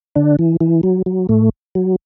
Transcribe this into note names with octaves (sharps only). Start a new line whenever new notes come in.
D3 D4
E3
E3
F#3
F#3
A2 A3
F#3